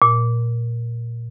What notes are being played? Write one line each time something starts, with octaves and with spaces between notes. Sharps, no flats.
A#2